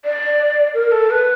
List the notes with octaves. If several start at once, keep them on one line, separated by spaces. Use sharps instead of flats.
D5
A#4
A4
B4